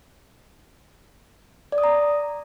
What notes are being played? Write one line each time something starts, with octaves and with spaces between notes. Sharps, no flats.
D5
D#6
A#5